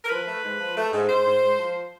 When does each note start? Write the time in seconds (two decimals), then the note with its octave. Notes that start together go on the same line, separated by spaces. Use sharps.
0.04 A#4
0.09 F3 B4
0.27 A3
0.43 G#2
0.59 F3
0.76 A3
0.92 G#2
1.08 G#2 C5
1.25 G#2
1.42 G#2
1.59 F3